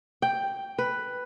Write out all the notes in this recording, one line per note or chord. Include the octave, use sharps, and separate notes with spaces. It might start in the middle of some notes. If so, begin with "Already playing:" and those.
G5
B4